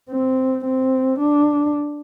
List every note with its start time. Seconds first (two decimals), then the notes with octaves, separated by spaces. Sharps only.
0.10 C4
0.65 C4
1.20 D4